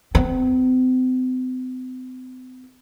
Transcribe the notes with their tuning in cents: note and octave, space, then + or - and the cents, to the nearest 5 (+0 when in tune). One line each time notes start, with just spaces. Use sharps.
C4 -40